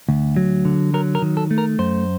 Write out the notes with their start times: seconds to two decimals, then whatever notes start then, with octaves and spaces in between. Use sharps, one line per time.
0.09 D2
0.36 F#3
0.65 D3
0.94 F#3 A#4
1.15 A#4
1.22 D#3
1.37 A4
1.51 A3
1.58 A#4
1.79 F#2 C5